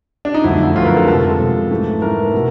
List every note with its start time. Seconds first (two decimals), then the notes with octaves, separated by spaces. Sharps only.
0.25 D4
0.34 D#4
0.44 F2 D3 F#3 A3 E4
0.76 F2 D3 F#3 A3 F4
0.82 B4
0.86 A#4
0.97 A4
1.07 C3 F3 G#3 A4
1.39 C3 F3 G#3
1.71 G#2 E3 A3
2.02 G#2 E3 A3 A#4
2.34 B2